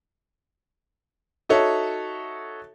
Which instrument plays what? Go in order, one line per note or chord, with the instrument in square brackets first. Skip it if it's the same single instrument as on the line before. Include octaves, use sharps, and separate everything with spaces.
[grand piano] D#4 F#4 A4 C#5 E5